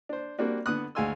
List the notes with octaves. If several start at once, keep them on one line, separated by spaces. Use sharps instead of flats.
D4 C5
G3 A#3 C4 D4 F#4
D3 B3 D#6 F#6
D2 G#3 F5 G#5 C6 E6